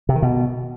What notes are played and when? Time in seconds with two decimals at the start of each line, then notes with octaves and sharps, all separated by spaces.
0.09 C3
0.16 D#3
0.22 B2